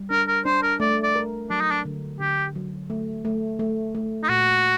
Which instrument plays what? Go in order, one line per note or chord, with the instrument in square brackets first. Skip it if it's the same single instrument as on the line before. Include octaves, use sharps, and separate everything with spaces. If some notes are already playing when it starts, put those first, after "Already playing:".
Already playing: [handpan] G3
[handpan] D4 [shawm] A#4
[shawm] A#4
[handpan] D4 [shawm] C5
[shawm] A#4
[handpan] A3 [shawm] D5
[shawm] D5
[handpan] A#4
[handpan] F#3 [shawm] D4
[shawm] D#4
D4
[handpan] D3
[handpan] D3 [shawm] G4
[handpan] F#3
A3
A3
A3
A3
[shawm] D#4
[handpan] A#2 [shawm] F#4